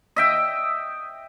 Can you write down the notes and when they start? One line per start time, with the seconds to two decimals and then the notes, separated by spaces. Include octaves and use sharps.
0.16 D#5 E5 G5